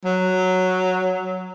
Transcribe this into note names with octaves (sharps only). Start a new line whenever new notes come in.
F#3